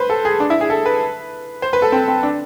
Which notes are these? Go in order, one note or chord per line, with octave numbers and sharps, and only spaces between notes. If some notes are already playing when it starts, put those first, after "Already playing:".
Already playing: B4 C5
A4
G#4
D4
E4
G#4
A4
B4
C5
B4
A4
C4
C4
D4